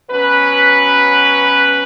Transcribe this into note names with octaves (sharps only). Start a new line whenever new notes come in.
B2 F#3 C#4 B4